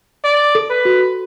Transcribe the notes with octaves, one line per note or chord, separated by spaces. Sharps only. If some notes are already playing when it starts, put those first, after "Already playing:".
D5
A4
B4
F#4